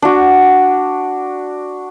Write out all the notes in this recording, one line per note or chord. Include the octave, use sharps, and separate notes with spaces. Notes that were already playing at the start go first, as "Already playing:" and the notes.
D4 F#4